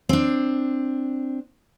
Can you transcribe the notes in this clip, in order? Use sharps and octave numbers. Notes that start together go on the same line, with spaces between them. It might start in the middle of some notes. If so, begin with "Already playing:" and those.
C4 D4